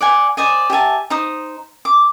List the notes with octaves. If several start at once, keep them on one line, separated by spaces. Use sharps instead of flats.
D5 F#5 G#5
C5 D5 D#5 G#5
G4 E5 G#5 A5
D#4 C5 D#6
D6